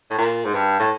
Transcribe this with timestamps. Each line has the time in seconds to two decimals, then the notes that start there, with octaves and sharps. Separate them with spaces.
0.11 A2
0.18 A#2
0.45 G#2
0.54 G2
0.80 A2